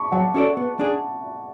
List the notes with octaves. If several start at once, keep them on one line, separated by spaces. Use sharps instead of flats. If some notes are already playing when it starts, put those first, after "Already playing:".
Already playing: A5 B5 C#6 D6
F#3 F#5 A5
C#4 F#4 A4 D5
B3
D4 G#4